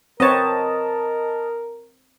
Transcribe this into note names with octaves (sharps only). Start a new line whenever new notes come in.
C4 A#4 B4 C#5 D#5 A5